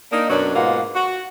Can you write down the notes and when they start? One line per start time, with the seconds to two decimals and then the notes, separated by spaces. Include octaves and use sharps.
0.12 A#3 D4 D#4
0.30 F#2 B2 F#3 C#4 D4
0.55 G#2 B2 A#3 F4 F#5
0.96 F#4